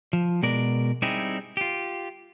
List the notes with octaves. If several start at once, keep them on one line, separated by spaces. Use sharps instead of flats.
F3
B2 G#3 A#4 D5
G3 C4 D#4 E4 G4 G#4
F4 G4